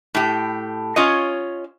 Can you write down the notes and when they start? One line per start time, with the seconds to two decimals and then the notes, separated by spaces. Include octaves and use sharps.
0.15 A2 G4
0.96 C#4 F4 C#5 D#5